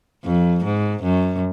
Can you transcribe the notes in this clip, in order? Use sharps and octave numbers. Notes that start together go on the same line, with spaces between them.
F2
G#2
F#2